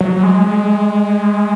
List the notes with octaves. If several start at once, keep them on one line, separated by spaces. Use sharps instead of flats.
F#3
F#3
G#3
G#3